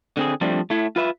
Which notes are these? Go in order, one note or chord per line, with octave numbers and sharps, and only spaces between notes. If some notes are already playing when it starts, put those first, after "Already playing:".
D3 C4 G#4
F3 G3 A3 C4 D4
A3 E4
F4 B4 E5